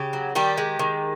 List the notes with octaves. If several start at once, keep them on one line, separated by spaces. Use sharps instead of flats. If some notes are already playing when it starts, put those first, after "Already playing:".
Already playing: C#3 G4
F#3
D#3 G3 G4
G#3
D#3